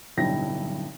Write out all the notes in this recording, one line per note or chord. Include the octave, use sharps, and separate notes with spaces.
D1 B1 G2 E4 G5 A#6